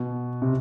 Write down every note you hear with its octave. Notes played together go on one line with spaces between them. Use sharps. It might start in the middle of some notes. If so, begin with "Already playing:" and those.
Already playing: B2
C3